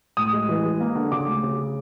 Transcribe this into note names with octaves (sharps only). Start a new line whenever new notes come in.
A2 D#6
G#3
E3
G#3
A#3
D3
C#3 D6
D2
C#3